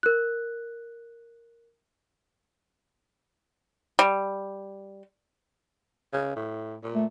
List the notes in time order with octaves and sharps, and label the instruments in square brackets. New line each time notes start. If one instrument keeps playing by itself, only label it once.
[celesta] A#4 F#6
[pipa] G3
[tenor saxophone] C#3
A2
A#2
[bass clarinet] A3